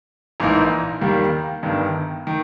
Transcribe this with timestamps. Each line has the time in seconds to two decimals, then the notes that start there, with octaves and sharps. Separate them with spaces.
0.40 A#1 G#2 E3 A#3 D#4
1.01 D#2 D#3 G3 A#3
1.63 G1 G2 D#3
2.27 D#3